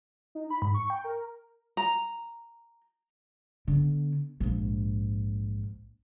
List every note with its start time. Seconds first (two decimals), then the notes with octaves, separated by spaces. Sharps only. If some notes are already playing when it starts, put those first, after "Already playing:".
0.35 D#4
0.50 B5
0.62 G#2
0.74 C#6
0.90 G5
1.04 A#4
1.77 A#5
3.68 D3 B3
4.40 A#1 G#2